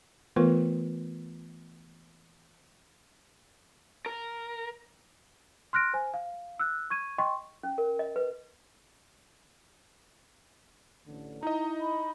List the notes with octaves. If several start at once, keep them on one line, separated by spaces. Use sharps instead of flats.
E3 A3 B3 F4 A#4 B4
A#4
C6 F6 F#6 A#6 D7
C5 G#5
F5
E6 F#6
C#6 G#6 D#7
D#5 G5 C6 C#6
C#4
A#4
D#5
B4
A1 D3
D#4 E4 D#5 A#5
B5